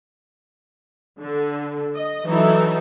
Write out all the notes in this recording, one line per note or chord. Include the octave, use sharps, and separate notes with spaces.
D3
D#5
E3 F#3 D#4 E4 A4